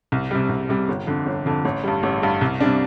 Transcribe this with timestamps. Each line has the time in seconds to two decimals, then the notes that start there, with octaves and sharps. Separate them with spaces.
0.12 C2
0.31 C3 G3
0.49 C2
0.69 C3 G3
0.88 G1
1.07 F2 D3
1.26 G1
1.46 F2 D3
1.65 A1
1.84 G2 G3
2.03 A1
2.22 G2 G3
2.41 C2
2.60 C3 G3 D4